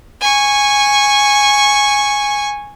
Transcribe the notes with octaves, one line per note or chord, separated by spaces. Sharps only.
G#5 C#6